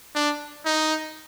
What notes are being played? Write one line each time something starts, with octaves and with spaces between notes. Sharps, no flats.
D4
D#4